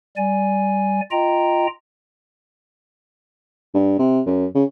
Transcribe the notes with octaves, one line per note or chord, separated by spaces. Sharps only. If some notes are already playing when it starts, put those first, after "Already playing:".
G3 D5 G#5
F4 D#5 G5 A#5
G2
C3
F#2
C#3